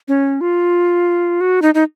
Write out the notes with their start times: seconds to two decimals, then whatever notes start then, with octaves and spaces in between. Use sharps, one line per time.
0.08 C#4
0.41 F4
1.41 F#4
1.62 D#4
1.75 D#4